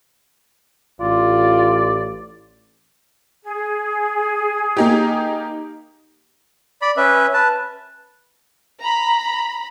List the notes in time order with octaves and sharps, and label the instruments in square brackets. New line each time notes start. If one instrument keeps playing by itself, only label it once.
[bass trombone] A1 [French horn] F4 [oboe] D5
[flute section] G#4
[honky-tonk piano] A#3 D#4 G4
[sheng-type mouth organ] D5 B5
C#4 B4 E5
B4 A5
[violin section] A#5 B5